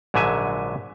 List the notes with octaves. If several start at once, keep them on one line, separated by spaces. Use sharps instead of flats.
A#1 G#2 D3 F#3 E5 G#5